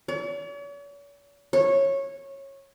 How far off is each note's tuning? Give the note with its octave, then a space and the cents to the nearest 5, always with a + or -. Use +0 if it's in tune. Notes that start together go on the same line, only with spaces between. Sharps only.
C#5 +45
C#5 -15